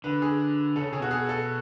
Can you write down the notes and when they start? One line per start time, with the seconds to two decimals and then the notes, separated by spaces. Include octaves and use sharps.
0.04 D3 B4
0.22 G#4
0.76 C#3 A4
0.93 C#3 G#4
1.00 B2 F#4
1.11 G#4
1.29 A4